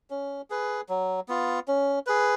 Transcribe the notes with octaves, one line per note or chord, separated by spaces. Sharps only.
C#4
G#4 B4
F#3
B3 F4
C#4
G#4 B4